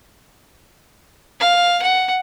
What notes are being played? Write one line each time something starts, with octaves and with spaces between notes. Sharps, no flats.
F5
F#5